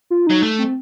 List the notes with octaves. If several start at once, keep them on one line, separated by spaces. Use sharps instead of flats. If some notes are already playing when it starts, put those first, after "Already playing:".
F4
F#3 D#4
A3
C4